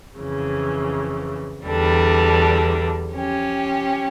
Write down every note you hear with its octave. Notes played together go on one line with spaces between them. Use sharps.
F2 C#3 E3
E2 D3 G3 D4
F3 C#4 G4